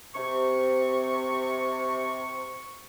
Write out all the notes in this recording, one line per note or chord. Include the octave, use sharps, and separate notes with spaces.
C3 C#6